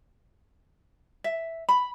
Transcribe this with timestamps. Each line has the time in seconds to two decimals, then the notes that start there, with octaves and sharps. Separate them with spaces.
1.24 E5
1.69 B5